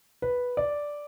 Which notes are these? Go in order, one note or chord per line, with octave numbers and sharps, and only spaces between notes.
B4
D5